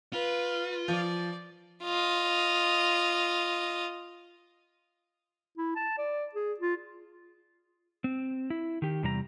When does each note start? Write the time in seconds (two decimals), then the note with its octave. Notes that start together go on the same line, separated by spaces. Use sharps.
0.13 F4 B4
0.88 F3 D5
1.84 F4 D#5
5.58 E4
5.75 A5
5.98 D5
6.35 G#4
6.60 F4
8.04 C4
8.50 E4
8.82 D#3 G4
9.03 E2 C3 G3 D#4 A#5